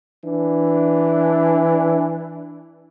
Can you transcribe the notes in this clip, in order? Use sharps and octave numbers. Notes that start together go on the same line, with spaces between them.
E3 D4